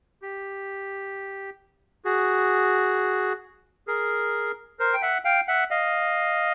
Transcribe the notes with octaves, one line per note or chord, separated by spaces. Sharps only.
G4
F#4 G#4
G#4 A#4
A#4 C5
G5
E5 F#5
F5 G5
E5 F#5
D#5 F5